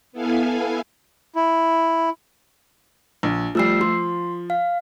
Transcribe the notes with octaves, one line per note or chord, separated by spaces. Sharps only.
B3 E4 A4 F5 G#5
E4
A#1
F3 G3 A3 E6 C7
F3 C6
F5